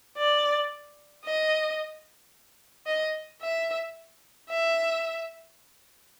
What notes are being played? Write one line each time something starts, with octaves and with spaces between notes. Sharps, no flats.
D5
D#5
D#5
E5
E5